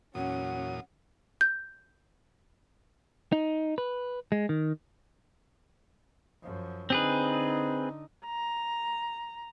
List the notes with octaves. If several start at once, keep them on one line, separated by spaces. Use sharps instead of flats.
E2 A#2 F#3 C#4 F#5 D#6
G6
D#4
B4
G#3
D#3
F#2 F3
D3 C4 D#4 G#4 B4
A#5